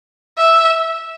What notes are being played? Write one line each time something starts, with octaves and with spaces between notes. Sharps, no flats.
E5